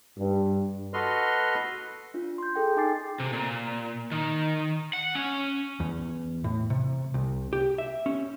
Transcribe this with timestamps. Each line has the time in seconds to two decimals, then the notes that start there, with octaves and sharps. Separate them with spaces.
0.17 G2
0.94 F#4 A4 B4 D#5 C6 F6
2.14 D4 F4
2.38 C6 G6
2.56 G#4 A4 G5
2.77 D#4 G5 G#5 D6 A6 C7
3.20 C3
3.33 A#2
4.12 D#3
4.93 F#5
5.15 C#4
5.80 E2
6.44 A2
6.70 C3
7.14 C2
7.53 G4
7.78 E5
8.06 C#4